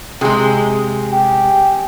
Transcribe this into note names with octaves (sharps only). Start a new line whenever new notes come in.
C3 G#3 G#4 D#6
G4